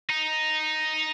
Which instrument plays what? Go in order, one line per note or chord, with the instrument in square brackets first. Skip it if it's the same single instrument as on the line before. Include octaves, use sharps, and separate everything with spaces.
[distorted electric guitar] D#4